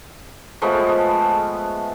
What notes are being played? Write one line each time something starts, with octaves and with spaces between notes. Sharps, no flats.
F3 G#3 A3 B3